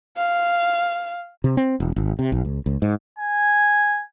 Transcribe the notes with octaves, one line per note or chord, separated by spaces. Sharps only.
F5
C3
C4
E1
G#1
C3
B1
C#2
C#2
G#2
G#5